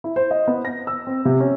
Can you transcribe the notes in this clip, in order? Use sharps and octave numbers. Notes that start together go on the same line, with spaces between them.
E4
C5
D#5
B3
A#6
E6
C4
C3
C#4